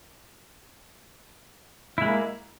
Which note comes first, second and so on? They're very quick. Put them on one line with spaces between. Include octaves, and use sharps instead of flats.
E4 G#3 A#3